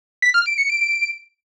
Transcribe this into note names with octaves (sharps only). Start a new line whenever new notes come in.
B6
F6
D7
C#7
D7